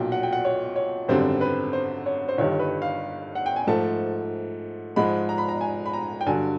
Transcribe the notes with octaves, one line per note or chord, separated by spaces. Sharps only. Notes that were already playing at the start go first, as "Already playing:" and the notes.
Already playing: B1 A#2 F#3 G5
F#5
G5
F#5
C#5
C#5
G#1 F#2 D3 G3 C4 C5
B4
C5
C#5
C5
G1 G2 D#3 G3 C#5
B4
F5
F#5
G5
G#5
G#2 F3 A3 A5
G#2 F3 G#3 B5
A#5
B5
A#5
G#5
B5
A#5
G5
G2 D3 F#3 G#5